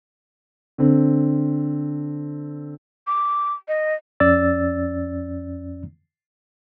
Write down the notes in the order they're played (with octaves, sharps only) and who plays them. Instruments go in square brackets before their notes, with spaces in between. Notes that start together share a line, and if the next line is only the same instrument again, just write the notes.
[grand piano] D3 C4
[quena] D6
D#5
[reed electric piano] F2 C#4 D5 E6 A6